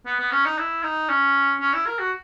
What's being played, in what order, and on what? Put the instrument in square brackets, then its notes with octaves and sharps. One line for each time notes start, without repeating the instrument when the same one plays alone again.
[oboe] B3
B3
C#4
D#4
E4
D#4
C#4
C#4
E4
A#4
F#4